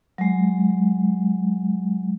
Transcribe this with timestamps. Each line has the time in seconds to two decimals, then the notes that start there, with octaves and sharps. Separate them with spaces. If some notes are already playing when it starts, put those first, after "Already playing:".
0.18 F#3 G#3